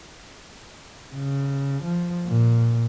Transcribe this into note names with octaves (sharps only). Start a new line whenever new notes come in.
C#3
F3
A#2